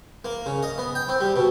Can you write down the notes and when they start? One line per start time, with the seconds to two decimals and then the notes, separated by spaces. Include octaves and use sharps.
0.25 A#3
0.46 C#3
0.63 D#5
0.78 B3
0.95 G5
1.08 C4
1.21 G3
1.36 B2